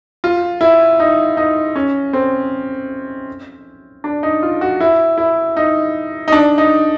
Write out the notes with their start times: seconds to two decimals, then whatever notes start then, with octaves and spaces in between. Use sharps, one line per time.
0.24 F4
0.61 E4
1.00 D#4
1.37 D#4
1.75 C#4
2.13 C4
4.04 D4
4.23 D#4
4.42 F4
4.61 F#4
4.80 E4
5.18 E4
5.57 D#4
6.28 D#4
6.32 D4
6.58 D#4